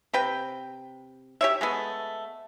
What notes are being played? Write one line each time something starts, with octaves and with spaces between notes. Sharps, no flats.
C3 B4 G5
G4 C#5 E5
G#3 A3 B3